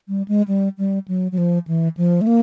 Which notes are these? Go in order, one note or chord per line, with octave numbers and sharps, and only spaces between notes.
G3
G#3
G3
G3
F#3
F#3
F3
E3
F3
A3
A#3